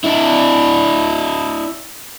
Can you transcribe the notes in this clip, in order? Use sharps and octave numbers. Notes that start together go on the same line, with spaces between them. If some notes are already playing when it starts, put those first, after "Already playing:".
D4 E4